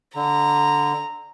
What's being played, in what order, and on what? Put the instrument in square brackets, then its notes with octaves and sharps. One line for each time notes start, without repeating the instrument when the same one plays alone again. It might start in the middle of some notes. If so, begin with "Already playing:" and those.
[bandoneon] D3 [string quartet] A#5